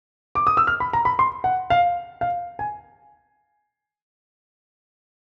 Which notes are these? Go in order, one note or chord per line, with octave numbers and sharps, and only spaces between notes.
D6
D#6
E6
F6
B5
A#5
B5
C6
F#5
F5
F5
G#5